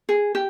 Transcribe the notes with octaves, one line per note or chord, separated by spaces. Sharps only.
G#4
G4